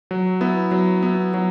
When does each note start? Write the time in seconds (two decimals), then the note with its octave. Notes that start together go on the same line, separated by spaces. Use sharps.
0.11 F#3
0.41 B3 E4
0.71 F#3
1.03 B3 E4
1.34 F#3